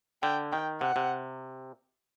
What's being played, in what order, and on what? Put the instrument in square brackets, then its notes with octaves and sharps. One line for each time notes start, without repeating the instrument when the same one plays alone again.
[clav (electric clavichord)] D3 [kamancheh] G5
[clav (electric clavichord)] D#3 [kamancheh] G5
[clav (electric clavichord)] C3 [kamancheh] F#5
[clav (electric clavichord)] C3